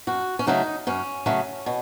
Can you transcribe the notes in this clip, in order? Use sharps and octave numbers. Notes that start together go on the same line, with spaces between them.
F#2 F#4
C#4
C#3 F#3 A3 D#4
F#2 C#4
C#3 F#3 A3
B2